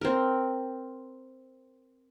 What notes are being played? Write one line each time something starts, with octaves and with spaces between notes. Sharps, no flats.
C4 A#4